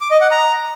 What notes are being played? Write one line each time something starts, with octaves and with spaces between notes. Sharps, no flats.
D6
D#5
F#5
A#5